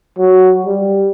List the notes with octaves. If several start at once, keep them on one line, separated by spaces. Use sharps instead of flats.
F#3
G3